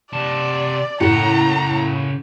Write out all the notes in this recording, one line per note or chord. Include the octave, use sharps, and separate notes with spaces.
C3 D5 A5
A2 C#3 F#5 A#5